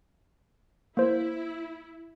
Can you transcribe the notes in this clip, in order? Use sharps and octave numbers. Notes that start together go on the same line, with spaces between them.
A#3 E4 C5